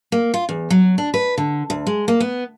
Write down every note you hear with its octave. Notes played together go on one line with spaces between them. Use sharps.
A#3
F4
E2
F#3
D4
B4
D3
D2
G#3
A#3
B3